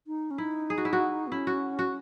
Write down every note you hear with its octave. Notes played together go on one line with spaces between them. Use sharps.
D#4
C#4
D#4 E4
G#4
F#4
E4
F#4
B3
C#4 E4
F#4
F#4